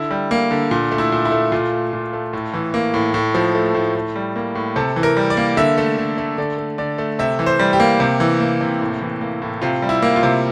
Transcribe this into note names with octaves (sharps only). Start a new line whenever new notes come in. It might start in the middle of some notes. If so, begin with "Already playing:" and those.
Already playing: D3 E4
G3
A#3
D3
A#2
A3
E4
A#2
E4
A3
A#2 F4
A3
A#2
A3
A2
E3
A#3
A2
A2
F3
A3
A2
A2
G3
A#3
A2
C3 A4
E3
A#4
G3
D5
A#3
D3 E5
A3
D3
A3
D3 D5
A3
D3 D5
A3
C3 E5
E3
C5
G3
G4
A#3
C3
E3
A#3
C3
A2
E3
A#3
A2
C3 F4
G3
E4
A#3
F4
C3